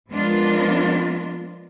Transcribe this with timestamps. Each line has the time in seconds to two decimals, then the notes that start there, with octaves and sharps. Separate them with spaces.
0.10 F3 G#3 B3 D4 F4 A#4